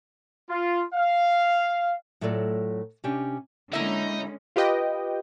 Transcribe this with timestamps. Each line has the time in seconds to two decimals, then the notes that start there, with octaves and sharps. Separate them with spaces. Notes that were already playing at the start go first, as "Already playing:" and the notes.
0.50 F4
0.95 F5
2.21 A2 F#3 A3 F4 A4 D5
3.04 C3 C#4 D4 G4
3.73 D3 G#3 A#3 C#4 D#4 E4 E5
4.56 F4 G4 B4 D#5 G5